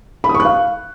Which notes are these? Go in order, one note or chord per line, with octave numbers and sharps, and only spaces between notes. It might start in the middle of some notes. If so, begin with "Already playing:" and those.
B5
D#6
C#6
F#6
F5